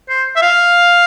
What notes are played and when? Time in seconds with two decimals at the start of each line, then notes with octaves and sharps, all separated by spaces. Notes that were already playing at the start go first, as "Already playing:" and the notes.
0.09 C5
0.36 E5
0.42 F5